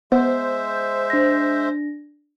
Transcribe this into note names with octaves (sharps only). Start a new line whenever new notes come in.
G#3 B3 C5 E5
D4 A#6